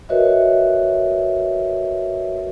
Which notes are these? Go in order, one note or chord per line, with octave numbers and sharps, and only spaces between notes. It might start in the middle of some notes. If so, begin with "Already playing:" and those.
F#4 A#4 B4 C#5 D#5 E5